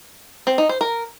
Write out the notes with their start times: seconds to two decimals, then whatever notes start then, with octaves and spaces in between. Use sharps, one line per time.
0.47 C4
0.58 D#4
0.69 C5
0.81 A#4